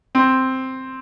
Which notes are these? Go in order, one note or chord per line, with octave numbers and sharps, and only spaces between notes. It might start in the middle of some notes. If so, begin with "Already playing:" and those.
C4